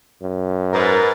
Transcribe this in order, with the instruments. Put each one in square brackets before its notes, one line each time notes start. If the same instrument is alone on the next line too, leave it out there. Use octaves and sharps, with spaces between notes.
[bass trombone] F#2
[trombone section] G#2 [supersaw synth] A#4 B4 A6